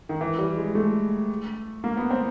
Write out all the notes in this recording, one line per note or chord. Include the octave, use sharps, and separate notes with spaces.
D#3
E3
G3
G#3
A3
A#3
B3
C4